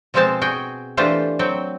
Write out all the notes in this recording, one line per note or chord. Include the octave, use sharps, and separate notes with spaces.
B2 F3 G#3 C4 C5 A5
F#4 G#4 G5
E3 A3 D4 F4 G4 C5
F#3 C4 G5